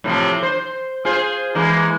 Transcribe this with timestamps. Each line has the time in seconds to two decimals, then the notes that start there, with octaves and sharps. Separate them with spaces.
0.04 A2 C3 F3
0.43 C5
1.05 F4 G#4 C5
1.55 E3 G#3 A#3